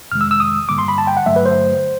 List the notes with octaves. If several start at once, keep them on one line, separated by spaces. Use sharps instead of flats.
F2 C3 D#3 G#3 F6
E6
E6
D#6
G2 D3 G3 A#3 D6
C6
B5
A5
G5
F#5
G2 D3 F#3 A3 E5
B4
C5